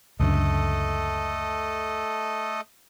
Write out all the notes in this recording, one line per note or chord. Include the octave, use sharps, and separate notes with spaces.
C#2 F#2 D3 A3 A4 D#5